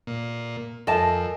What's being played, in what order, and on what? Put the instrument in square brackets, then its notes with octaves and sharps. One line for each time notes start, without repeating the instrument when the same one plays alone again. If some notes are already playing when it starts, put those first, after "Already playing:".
[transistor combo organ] A#2
[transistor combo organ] F2 [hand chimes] A4 A#4 G#5 [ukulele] D#5 A5